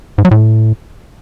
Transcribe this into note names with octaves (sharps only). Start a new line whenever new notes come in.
G#2
F#3
A2